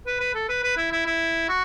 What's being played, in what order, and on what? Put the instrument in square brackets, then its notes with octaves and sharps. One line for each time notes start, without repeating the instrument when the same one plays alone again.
[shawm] B4
B4
A4
B4
B4
E4
E4
E4
F#4